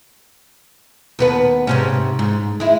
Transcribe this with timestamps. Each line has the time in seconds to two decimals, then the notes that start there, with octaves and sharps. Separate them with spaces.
1.19 D#2 B3 B4
1.67 G#2 C3 C#4
2.19 G#2
2.60 G#3 E4